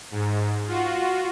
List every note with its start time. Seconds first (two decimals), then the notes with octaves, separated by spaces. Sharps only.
0.11 G#2
0.67 F4 F#4